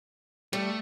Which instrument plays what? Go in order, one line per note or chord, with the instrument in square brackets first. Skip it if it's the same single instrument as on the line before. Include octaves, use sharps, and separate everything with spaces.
[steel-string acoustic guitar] G3 [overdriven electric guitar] A3